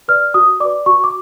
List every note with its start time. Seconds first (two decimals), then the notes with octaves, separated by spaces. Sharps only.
0.08 B4 D5 F6
0.34 F#4 D#6
0.60 D5 D6
0.65 B4
0.86 F#4 C#6
1.04 D6